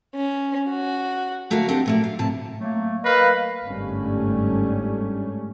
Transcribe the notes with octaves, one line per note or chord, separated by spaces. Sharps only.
C#4
F#4
D2 A3 A#3 F#4 A#4 F5
C4 D4 G4 D#5 F#5 A5
A#2 A3 A#3
F5
A2 C3 A5
F#3 A3 A#3
A#4 B4 D#5 F5
G1 G#2 G3 A3 C#4